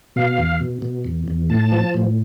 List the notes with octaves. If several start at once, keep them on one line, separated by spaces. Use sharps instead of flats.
B2 F5
E2
B2
B2
E2
E2
A2 A5
F3
A2